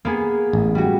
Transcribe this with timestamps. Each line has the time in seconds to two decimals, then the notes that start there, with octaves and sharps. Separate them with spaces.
0.05 A#3 B3 G#4
0.53 A1
0.75 G3 F#4